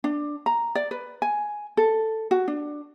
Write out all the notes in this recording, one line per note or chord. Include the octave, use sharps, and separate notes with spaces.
D4
A#5
D5
B4
G#5
A4
F#4
D4